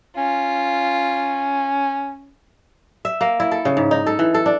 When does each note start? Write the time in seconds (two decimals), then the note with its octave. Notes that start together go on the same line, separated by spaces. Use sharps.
0.18 C#4 F4
3.05 E5
3.21 A#3
3.40 E4
3.51 A4
3.65 C#3
3.77 G#2
3.91 D#4
4.06 A4
4.19 E3
4.34 A4
4.46 D4